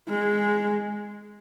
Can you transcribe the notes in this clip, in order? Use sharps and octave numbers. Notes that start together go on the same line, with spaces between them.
G#3